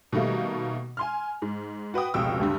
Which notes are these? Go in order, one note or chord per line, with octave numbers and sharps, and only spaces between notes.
B2 D#3 G3 A3 A#3
G#5 C6 F6
G#2
F#4 B4 G5 D#6
F1 C#2 B2 G5 E6
D2 G2 G3